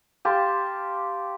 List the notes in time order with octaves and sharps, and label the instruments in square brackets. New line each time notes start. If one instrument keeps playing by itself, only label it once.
[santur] G4 F5 A5 C6